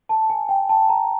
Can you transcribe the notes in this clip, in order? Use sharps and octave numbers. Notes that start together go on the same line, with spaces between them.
A5
G#5
G5
A5
A#5